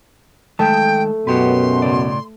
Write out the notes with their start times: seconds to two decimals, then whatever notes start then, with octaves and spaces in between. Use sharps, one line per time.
0.59 D#3 G#3 A3 G5 A5
1.27 F#2 B2 F#4 G4 B4 C6
1.82 A2 C#3 D5